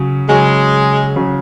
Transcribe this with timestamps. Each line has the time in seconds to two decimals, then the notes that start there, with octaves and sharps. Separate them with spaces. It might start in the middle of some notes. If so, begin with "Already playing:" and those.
Already playing: C#3 F#3 C#4
0.29 C#3 F#3 G#3 C#4
1.16 C#3 F#3 C#4